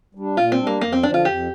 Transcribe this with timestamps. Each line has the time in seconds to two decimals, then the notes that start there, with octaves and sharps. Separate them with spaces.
0.15 G3 D4
0.37 A#2 F4
0.52 C4
0.59 G3 D4
0.67 A#3
0.81 F2 A#3
0.92 C4
1.03 D3 F3 D4
1.14 F4
1.25 F2 G4